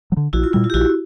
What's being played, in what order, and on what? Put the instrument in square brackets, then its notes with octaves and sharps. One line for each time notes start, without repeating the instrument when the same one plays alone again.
[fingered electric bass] F#3
D3
[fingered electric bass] A#1 [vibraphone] E4 F#4
[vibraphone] F4
[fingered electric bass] A#2 G3 [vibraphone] E4
[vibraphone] F4
G4
[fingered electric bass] A#1 [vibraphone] E4 F#4